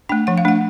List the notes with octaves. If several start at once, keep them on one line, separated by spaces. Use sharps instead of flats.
A3 D4 G5
F3 F#5
F5
A3 D4 F#5